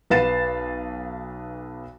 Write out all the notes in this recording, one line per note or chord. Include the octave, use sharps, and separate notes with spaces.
B1 B4 F5 A6 C7 E7